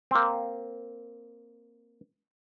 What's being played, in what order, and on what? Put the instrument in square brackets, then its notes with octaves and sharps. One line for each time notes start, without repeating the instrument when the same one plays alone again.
[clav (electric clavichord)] A#3 C4